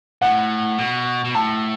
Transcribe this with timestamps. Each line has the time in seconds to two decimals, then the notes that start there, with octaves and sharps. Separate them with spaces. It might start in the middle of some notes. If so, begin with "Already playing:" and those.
0.22 A2 F#5
0.78 B2
1.24 B2
1.35 A2 A5